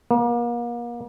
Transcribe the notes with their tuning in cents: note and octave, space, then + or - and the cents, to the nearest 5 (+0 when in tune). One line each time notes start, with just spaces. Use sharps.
A#3 +40